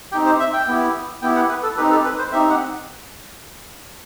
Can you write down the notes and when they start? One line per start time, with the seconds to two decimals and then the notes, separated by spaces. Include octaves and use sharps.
0.12 C4 D#4 G4 G5
0.26 C5
0.39 E5
0.53 G5
0.67 B3 E4 G4
1.22 B3 E4 G4 G5
1.36 F#5
1.49 B4
1.63 A4
1.77 C4 D#4 G4 B4
1.91 A4
2.04 B4
2.18 C5
2.32 C4 D#4 G4 E5
2.50 F#5